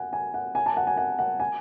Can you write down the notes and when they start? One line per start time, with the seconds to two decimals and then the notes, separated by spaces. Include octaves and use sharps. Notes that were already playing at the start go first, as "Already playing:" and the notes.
Already playing: F#5 G#5
0.13 G#5
0.34 F#5
0.55 G#5
0.66 A5
0.77 F#5
0.87 G#5
0.98 F#5
1.19 F#5
1.40 G#5